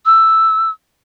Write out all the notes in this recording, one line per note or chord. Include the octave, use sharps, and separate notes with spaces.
E6